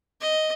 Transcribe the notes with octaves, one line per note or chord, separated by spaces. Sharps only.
D#5